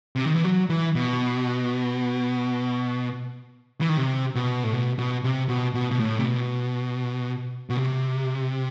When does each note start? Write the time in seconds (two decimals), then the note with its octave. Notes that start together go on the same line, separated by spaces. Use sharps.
0.16 C3
0.25 D#3
0.34 E3
0.44 F#3
0.70 E3
0.95 B2
3.81 E3
3.89 D#3
3.98 C3
4.35 B2
4.64 A2
4.73 B2
4.98 B2
5.24 C3
5.49 B2
5.74 B2
5.91 B2
6.00 A2
6.19 C3
6.25 B2
7.70 B2
7.77 C3